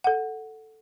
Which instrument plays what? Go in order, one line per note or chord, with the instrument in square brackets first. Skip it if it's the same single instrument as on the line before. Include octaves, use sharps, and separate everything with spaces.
[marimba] A4 F#5